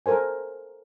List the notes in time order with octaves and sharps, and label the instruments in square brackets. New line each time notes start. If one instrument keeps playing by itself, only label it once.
[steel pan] A4 A#4 C5 G#5